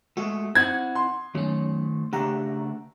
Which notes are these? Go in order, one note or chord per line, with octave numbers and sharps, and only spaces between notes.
G#3 A3 F#4
C4 E4 F#5 G#6
C6
D#3 F#3 A3 C#4
C#3 A3 D4 G4 F#5 A#5